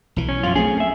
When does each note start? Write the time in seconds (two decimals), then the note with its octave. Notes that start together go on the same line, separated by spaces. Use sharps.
0.16 B1 E3
0.29 C#4
0.43 F#2 F3 F4
0.55 A3 C4 C#4 G#4
0.80 E5